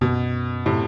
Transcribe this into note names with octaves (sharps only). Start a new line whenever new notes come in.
F#2 B2
A2 C3